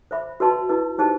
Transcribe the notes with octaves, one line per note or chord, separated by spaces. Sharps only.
C5 E5 B5
F#4 B4 D#5 A5 C6
E4 B4 D#5
D#4 G4 C5 D#5 A5